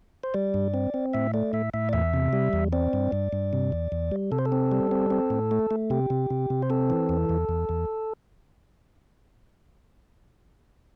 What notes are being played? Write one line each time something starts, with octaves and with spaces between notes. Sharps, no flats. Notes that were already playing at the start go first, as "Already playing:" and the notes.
C5
G3 D5
G2
C4
C4
A2 E5
A3 D5
A2 E5
A2 E5
D5
E2 E5
C3
G3
E2
C4 D5
G2
G2
G2
C3
E2
E2
G3
C3 A4
C5
A4
C4
G3
C4
C4
A2
A3
A3
C3 G4
C3
C3
C3
C5
C4 A4
E3
E2
E2
E2
E2